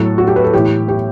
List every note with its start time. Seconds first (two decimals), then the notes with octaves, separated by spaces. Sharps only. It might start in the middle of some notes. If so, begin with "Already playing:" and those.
Already playing: A2 F#3 A4
0.18 F#4
0.28 G4
0.36 B4
0.44 A4
0.53 A2 E3 G4
0.88 G4